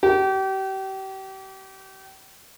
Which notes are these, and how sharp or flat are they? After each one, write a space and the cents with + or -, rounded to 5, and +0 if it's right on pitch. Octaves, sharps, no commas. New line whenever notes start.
G4 -35